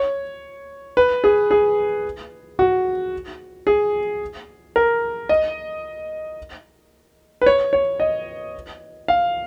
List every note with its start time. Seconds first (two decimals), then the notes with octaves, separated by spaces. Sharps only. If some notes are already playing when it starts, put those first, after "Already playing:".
Already playing: C#5
0.97 B4
1.24 G#4
1.51 G#4
2.59 F#4
3.67 G#4
4.76 A#4
5.29 D#5
7.42 B4
7.46 C#5
7.73 C#5
8.00 D#5
9.08 F5